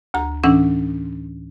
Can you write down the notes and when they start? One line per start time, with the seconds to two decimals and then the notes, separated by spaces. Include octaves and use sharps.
0.14 D2 A#5
0.44 A2 E3 C#4 D4 F#5 E6